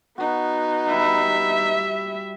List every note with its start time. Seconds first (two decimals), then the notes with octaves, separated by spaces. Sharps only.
0.18 B3 D#4 F#4
0.91 G3 E4 E5